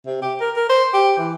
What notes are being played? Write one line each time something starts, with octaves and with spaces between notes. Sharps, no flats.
C3
G4
A#4
A#4
C5
G4
E3